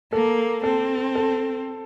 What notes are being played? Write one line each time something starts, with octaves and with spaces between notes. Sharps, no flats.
A#3 A4
C4 A4
A4